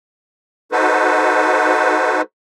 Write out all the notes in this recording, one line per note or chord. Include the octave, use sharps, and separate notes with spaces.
D#4 F#4 A4 B4 C5